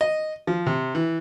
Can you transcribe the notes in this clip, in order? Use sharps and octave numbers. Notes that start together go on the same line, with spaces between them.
D#5
F3
C3
E3